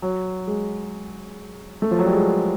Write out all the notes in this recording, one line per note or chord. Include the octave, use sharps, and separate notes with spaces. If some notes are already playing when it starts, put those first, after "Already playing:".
F#3
G#3
A3
F3
F#3
G3
G#3